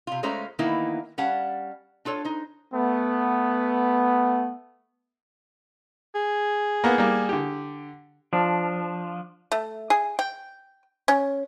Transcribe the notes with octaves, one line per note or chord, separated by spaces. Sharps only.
C3 F4
G#3 A3 C#4 F4 C5 A#5
D#3 E3 A#3 B3 D#4 E4
G3 C#4 F5 F#5 A5
D4 F4 A4 C#5
D#4 C5
A3 B3
G#4
A#3 B3
G3 A#3
D3 G4
F3 D4
A3
G#4
G5
C#4